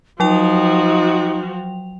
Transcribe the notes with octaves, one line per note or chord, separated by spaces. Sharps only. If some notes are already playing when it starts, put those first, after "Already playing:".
F3 F#3 D#4 F#4 G5 F7